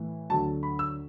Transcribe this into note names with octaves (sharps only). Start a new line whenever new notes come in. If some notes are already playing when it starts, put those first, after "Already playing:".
Already playing: A2 E3
D2 D3 F#3 A5
B5
E6